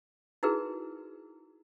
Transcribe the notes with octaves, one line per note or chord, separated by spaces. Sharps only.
D#4 E4 F#4 G#4 A#4 B4